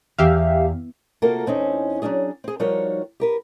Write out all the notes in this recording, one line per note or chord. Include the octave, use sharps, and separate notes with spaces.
E2 G4 E5 F5
C3 A#3 F4 F#4 A4 A#4
E2 C4 C#4 D#4
F#3 A#3 C#4 D4 G#4
C4 G#4
F3 G3 D#4 F#4 A#4 C#5
G4 A#4 B4